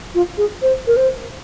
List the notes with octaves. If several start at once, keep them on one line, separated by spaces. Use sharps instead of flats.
F4
G#4
C5
A#4
C5